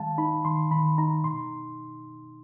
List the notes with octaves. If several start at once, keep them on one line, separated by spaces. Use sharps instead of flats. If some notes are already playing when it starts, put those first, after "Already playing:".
Already playing: D#3 G#3 F5 A5
D#4 B5
D#3 C6
D#3 B5
D#4 A#5
B2 C6